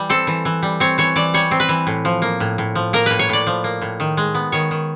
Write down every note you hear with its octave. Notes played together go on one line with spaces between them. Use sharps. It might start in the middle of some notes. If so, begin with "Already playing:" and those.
Already playing: E3 G3
C4 A4
E3
E3
G3
C4 C#5
E3 C#5
E3 D5
G3 C#5
C4
B4
E3
A2
F3
A#3
A2
A2
F3
A#3 A#4
A2 B4
C#5
A2 D5
F3
A#3
A2
D#3
G#3
B3
D#3 C#5
D#3